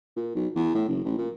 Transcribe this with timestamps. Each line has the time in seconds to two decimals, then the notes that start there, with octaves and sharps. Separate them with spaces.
0.16 A#2
0.35 B1
0.55 E2
0.75 A2
0.89 F#1
1.05 A1
1.18 A#2